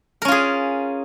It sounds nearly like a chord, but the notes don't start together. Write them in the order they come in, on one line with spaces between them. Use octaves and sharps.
A#4 C#4 F4 G#4